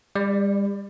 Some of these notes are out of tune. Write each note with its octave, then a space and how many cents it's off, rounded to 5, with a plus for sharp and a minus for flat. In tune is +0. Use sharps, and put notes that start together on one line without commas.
G3 +40 D5 +0